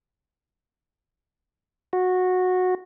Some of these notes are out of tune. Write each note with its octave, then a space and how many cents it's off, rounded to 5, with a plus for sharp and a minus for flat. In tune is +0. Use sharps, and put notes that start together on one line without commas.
F#4 -15